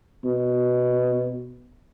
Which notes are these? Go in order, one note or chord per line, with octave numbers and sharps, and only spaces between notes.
B2